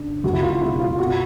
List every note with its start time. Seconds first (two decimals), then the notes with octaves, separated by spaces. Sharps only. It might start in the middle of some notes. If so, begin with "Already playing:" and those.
Already playing: C#3 D4
0.24 C#2 F#4
0.33 E4
0.43 F4
0.61 B2 G#3 C#4 E4
0.80 F4
0.99 B2 F#4